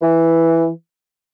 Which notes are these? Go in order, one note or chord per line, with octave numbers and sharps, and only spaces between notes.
E3